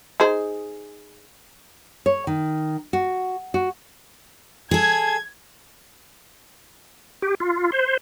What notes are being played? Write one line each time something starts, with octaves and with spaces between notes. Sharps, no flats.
D#4 G#4 C5
C#5
D#3
F#4
F#4
G#4 A4 G#6
G4
F4
C5